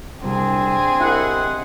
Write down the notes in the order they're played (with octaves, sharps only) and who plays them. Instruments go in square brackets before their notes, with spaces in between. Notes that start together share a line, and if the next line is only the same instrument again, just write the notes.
[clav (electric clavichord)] C2 [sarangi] C4 [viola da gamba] D4 G#4
[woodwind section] C2 D#5 F#5 [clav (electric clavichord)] E4